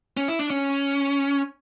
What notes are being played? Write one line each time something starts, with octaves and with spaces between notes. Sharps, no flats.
C#4
E4
D4
C#4